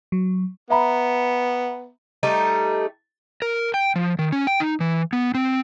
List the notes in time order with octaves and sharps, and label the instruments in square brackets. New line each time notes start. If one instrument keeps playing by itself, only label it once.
[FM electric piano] F#3
[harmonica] B3 [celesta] E5 A#5 B5
[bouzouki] G3 A3 D#4
[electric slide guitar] A#4
G5
F3
D#3
C#4
G5
D#4
E3
B3
C4